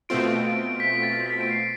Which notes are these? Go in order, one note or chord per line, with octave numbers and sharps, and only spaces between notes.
B2 A3 C4 F4 D7
D7
B6
A6
B6
D7
C7